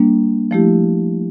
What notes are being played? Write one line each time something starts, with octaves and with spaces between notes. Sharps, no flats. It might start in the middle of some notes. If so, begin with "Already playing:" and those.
Already playing: G3 A#3 D4
F3 A3 E4 G4